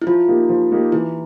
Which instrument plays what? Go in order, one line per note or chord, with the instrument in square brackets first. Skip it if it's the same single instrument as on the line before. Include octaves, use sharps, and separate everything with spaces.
[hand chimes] E4
[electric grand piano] F3 [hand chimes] F4
[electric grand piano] A#3 D#4 G4
F3
A#3 D#4 G4
[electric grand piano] E3 [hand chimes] E4